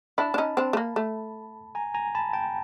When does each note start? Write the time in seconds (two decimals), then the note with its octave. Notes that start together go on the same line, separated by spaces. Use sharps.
0.18 D4 E4 A5 B5
0.34 D4
0.38 C#4 D#4
0.57 C4 D4
0.73 A3
0.77 A#3
0.96 A3
1.75 G#5 A#5
1.94 G#5 A#5
2.15 A5 B5
2.33 G5 A5